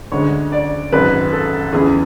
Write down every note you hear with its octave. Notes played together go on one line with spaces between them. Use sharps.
D2 D3 G#3 C#5
D5
G#1 F#2 C#3 B4
A4
E2 C#3 E3 G#4